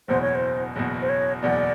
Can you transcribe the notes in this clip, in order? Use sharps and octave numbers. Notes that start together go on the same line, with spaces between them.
F#1 E2 B2 C5
C#5
C5
F#1 E2 B2
C5
C#5
F#1 E2 B2 D5